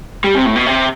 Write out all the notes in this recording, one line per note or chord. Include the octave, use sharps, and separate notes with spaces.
G3
C3
A2
B2
C3